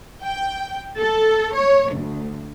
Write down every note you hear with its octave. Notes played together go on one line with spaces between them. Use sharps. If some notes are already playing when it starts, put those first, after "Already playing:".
G5
A4
C#5
D2